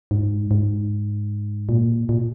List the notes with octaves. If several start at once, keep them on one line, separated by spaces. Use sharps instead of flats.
G#2
G#2
A#2
A#2